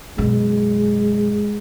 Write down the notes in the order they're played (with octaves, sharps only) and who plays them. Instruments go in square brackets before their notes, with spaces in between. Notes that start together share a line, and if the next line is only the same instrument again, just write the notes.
[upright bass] F#2 B2 [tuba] G#3